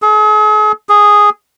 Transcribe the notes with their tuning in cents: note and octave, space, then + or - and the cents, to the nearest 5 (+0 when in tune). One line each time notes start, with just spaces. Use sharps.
G#4 +40
G#4 -5